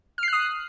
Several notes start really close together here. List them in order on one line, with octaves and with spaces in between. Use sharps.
F6 C7 F#6 D#6